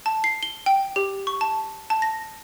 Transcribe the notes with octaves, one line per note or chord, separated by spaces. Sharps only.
A5
C7
G7
G5
G4
C#6
A5
A5
A#6